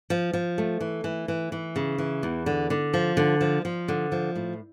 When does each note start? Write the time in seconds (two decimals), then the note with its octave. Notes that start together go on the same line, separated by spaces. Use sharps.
0.10 F3
0.33 F3
0.58 A3
0.81 E3
1.04 E3
1.28 E3
1.52 E3
1.76 C#3
1.98 E3
2.23 E2
2.46 D3
2.70 D3
2.94 F3
3.17 D3
3.41 F3
3.65 F3
3.88 D3
4.12 F3
4.36 A2